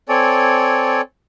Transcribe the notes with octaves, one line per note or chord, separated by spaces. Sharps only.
C4 A4 C#5 D5 G#5